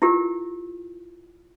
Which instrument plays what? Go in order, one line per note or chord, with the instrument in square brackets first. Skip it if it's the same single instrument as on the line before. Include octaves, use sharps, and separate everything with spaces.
[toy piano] E4 F4 G4 A#4